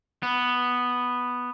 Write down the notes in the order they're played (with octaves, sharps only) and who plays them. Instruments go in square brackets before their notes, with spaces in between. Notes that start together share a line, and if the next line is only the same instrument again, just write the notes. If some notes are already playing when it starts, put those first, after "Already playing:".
[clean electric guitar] B3